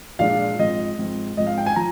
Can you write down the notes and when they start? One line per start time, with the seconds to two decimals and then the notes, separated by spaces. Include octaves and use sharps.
0.19 A#2 F3 G#3 D4 F5
0.59 G#2 F3 C4 D#5
0.99 G#2 F3 C4
1.37 G#2 F3 C4 D#5
1.47 F5
1.58 G5
1.66 G#5
1.76 F3 A#5